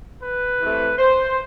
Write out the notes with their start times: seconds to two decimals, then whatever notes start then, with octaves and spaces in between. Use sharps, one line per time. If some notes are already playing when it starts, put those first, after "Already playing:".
0.23 B4
0.59 C3 E3 A3
0.98 C5